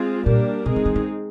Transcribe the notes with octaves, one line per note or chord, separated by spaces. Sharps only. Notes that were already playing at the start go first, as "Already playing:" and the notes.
Already playing: G#3 C4 F4 G#4
A#2 G3 A#3 D4 G4 A#4
C3 G#3 C4 D#4 G#4
D3
D#3
D#3